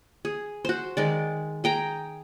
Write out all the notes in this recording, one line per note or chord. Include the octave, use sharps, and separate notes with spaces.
G#4
F#4 C5
D#3 G#3 D5
G#4 G5 A#5